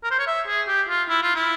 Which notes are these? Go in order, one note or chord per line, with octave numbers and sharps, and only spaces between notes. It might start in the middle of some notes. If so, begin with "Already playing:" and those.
A#4
C5
C#5
E5
G#4
G4
F4
E4
F4
E4